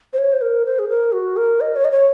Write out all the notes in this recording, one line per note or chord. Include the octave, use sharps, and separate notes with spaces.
C5
C#5
C5
A#4
C5
G#4
A#4
F#4
A#4
D#5
C#5
D#5
C#5